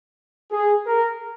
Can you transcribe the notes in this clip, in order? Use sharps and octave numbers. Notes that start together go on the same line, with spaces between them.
G#4
A#4